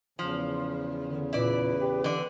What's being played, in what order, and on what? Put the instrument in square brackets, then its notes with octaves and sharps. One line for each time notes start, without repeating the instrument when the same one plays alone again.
[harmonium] E2 C#3 [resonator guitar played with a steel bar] F3
[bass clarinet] D3
[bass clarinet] A#2 [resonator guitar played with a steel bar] E4 D5 [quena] B4
[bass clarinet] G4
[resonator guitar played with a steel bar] D3 D5 [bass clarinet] E3